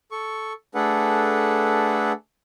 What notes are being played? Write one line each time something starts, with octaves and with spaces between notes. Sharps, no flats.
A4 C#6
A3 D4 G#4 A4 B4 F#5